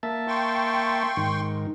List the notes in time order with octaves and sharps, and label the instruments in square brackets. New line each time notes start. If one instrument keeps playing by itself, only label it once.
[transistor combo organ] A#3 E5 A5
[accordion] G5 C6 C#6
[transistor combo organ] G#2 D#3